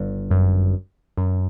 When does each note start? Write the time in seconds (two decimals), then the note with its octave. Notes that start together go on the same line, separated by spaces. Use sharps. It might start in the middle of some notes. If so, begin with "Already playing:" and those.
Already playing: G1 G2
0.31 F#2
1.17 F#2